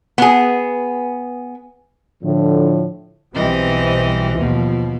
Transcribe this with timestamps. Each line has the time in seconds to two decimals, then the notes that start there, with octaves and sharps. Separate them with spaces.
0.18 B3 G#4
2.24 A2 D3 F3
3.35 B1 E3 G3 C4 D#5
4.38 D#2 B2 F3